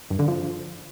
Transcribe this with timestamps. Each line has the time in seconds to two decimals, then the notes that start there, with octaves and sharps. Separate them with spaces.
0.10 G2
0.19 D3
0.28 F3